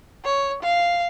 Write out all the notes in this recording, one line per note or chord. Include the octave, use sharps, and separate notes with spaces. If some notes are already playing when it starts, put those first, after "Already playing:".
C#5
F5